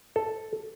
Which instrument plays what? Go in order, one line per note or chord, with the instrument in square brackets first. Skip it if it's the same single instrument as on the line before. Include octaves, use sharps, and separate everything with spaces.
[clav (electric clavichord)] A4